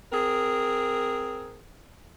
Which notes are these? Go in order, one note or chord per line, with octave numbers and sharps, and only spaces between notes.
C4 G#4 A#4